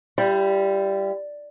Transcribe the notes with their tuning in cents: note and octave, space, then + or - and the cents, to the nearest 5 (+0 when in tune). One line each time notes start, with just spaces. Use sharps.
G3 +0 E4 +45